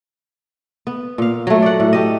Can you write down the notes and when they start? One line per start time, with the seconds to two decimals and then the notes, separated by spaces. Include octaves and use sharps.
0.87 B3
1.18 A#2 F5
1.47 F#3 A3
1.62 D5 F#5
1.80 A2
1.93 A3 G4 D#5